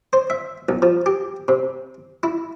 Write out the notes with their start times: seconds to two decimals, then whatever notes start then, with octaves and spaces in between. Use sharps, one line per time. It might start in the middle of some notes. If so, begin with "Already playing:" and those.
0.13 C5
0.30 E5
0.69 B1
0.82 F3
1.06 G4
1.48 C3
2.23 E4